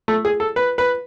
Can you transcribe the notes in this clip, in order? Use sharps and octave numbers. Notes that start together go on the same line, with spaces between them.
A3
G#4
A4
B4
B4